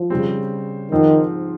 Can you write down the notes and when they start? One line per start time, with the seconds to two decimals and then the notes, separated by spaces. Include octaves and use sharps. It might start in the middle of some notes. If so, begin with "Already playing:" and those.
Already playing: F3
0.10 C#3 G3 C4
0.91 G#2 D#3 F3 C4